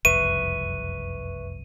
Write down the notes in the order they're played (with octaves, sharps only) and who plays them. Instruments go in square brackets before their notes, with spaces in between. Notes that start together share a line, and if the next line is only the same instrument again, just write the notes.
[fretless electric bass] F#1 C2 F2 [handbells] B4 E5 C#6 [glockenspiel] D#7